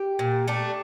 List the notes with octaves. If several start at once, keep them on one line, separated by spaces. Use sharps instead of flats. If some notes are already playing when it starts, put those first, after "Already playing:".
Already playing: G4
A#2
A3 D4